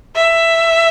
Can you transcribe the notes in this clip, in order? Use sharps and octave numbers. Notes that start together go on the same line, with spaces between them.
E5